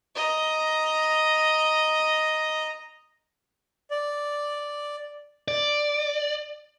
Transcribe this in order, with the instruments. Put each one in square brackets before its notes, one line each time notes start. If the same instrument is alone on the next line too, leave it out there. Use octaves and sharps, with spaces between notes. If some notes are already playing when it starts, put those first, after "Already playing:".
[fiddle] D#5 A#5
[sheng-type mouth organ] D5
[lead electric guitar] D5